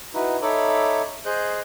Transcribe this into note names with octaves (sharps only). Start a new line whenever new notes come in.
D#4 E4 F#4 B4
D#4 A4 C#5 E5 B5 D6
G#4 C5 D#5 F#6 G6